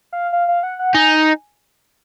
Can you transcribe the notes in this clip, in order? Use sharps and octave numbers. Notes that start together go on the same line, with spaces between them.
F5
F5
F5
F#5
F#5
D#4 G#5